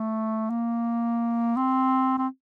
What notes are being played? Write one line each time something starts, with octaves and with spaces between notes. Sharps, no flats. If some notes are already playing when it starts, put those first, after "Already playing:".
Already playing: A3
A#3
C4
C4